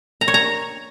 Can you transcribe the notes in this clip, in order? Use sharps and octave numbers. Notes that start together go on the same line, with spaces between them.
A#5
C#5
A#5